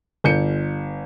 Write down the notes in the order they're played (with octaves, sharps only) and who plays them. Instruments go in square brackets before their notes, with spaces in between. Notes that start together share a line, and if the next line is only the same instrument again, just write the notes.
[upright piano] G1 G6 C#7